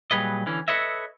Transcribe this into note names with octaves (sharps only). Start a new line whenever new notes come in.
A#2 F#3 G3 G#4 B4 D#5
D3 E3 C#4
A4 B4 C#5 D#5 E5